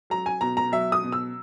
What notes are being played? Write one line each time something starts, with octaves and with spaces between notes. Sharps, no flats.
F#3 A#5
G#5
B2 A#5
A#5
F#3 E5
D#6
B2
E6